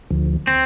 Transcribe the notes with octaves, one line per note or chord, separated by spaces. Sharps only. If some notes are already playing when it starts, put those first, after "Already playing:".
D2 D3 F3
C4